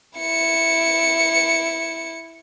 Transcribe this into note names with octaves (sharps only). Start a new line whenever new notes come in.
E4 C#7